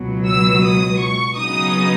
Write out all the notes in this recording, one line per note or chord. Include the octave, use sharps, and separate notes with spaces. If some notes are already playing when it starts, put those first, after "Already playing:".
Already playing: C#2 B2 F#3
E6
D#6
C#6
C#3 F#3 B3 D#4 D#6